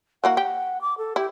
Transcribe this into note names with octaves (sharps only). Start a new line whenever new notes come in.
E3 A#3 F#4 F#5
G4
D6
A4
E4 G4